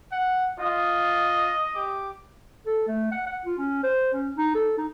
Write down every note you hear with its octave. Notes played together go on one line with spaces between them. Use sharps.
F#5
F4 D#5
G4 D6
A4
A3
F#5
F#5
F4
C#4
C5
C#4
D#4
A4
D#4